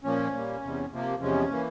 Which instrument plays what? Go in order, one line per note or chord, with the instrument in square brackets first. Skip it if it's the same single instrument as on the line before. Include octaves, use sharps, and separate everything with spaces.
[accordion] A#2 F3 A#3 C#4
A#2 G3 A#3
E2 C3 G3
C3 F3 A#3
E2 C3 F3 G#3 C#4
E3 A#3